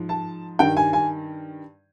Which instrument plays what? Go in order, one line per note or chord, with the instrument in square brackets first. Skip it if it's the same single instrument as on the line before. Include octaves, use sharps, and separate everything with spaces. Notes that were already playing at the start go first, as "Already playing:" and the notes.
Already playing: [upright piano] G#2 F3
A5
G2 D#3 G5
G#5
G#5